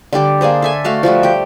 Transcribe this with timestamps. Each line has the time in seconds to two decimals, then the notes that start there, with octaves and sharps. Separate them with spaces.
0.13 D3 G3 G4 D5
0.41 A#3 D4 G#4 C5
0.62 A4 E5 G#5
0.84 A3 F#4 F5 A5
1.03 F3 G3 A3 F#4
1.23 G4 G5